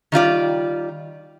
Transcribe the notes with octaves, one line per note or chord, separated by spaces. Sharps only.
D#3 G3 F4 D5